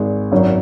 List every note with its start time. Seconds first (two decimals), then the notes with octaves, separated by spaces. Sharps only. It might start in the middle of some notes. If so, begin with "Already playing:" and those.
Already playing: G#1 G#2 G#3
0.31 G#1 F#2 F#3 C#4